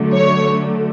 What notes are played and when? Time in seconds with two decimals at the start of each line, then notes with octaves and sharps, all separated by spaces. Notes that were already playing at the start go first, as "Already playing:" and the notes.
Already playing: D3 F#3 A3
0.13 C#5